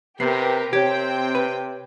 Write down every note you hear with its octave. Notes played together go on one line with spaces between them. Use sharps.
C3 B3 G4 A#4 B4 C7
C3 C4 G4 C#5 G5 G#6
B4